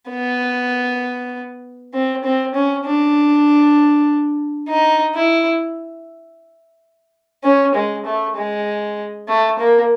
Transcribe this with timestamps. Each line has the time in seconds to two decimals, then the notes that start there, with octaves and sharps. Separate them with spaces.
0.10 B3
1.94 C4
2.24 C4
2.55 C#4
2.86 D4
4.69 D#4
5.15 E4
7.44 C#4
7.75 G#3
8.06 A3
8.37 G#3
9.28 A3
9.59 A#3